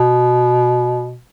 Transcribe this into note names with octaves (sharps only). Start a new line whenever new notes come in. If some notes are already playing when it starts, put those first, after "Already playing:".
Already playing: B2